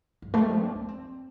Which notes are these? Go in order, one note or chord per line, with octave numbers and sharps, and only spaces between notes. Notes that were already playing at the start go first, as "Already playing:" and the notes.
G2
A3
G3
F3
D4
D4
C4